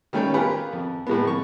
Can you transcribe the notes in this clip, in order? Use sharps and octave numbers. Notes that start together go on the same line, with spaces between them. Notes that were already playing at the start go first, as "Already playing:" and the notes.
D#3 G3 A3 C#4 C#5 G5
B3 F4 G4 G#4 A#4 B4
F2
A2 G#3 A#3 B3
F2 C#6